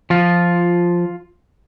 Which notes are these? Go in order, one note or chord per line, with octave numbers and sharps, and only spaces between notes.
F3 F4